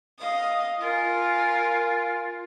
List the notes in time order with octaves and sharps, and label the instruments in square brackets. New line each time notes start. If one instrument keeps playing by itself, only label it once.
[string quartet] D#5 F5 D#6
[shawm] F4 [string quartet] A#4 G#5